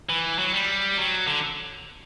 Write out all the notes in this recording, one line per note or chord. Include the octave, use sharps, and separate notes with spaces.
E3
F#3
G3
F#3
D3